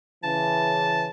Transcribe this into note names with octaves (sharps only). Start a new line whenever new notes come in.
C#3 E3 A5